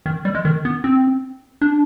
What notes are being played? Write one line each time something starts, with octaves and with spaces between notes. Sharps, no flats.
D#3
G3
G#3
D#3
B3
C4
D4